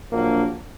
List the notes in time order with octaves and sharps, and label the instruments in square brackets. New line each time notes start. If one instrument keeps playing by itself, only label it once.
[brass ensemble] A#1 A#2 F#3 A#3 D4